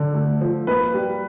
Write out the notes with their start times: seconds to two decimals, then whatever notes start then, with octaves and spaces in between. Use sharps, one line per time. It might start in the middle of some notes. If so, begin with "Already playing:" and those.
Already playing: D3
0.14 A3
0.41 F3
0.67 A#3 B4
0.94 G3